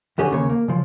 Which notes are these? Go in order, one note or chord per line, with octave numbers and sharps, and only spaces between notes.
F2 D3 G4 G#4 C#5
D#2 C#3 C#5
A#3
C#3 F3